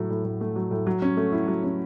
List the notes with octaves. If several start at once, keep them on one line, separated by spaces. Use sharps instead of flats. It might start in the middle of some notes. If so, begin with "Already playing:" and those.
Already playing: A2 F#3 A3
A2
A2
A3
F#3
A2
F#3
C#4
A3
E4
F#3
C#4